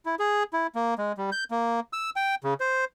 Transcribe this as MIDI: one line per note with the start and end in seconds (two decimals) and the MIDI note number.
0.06 0.15 64
0.19 0.43 68
0.53 0.67 64
0.75 0.94 58
0.98 1.12 56
1.18 1.30 55
1.32 1.44 91
1.51 1.80 58
1.93 2.10 88
2.16 2.35 79
2.44 2.54 49
2.60 2.85 72